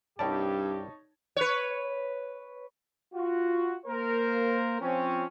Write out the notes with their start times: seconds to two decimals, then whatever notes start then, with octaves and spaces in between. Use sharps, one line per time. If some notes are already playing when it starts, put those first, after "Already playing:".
0.19 C2 G2 G3 D#4 G4 C#5 D5 A5
1.36 B4 C#5
3.13 F4 F#4
3.86 A#3 A#4 C5
4.81 F3 C4 C#4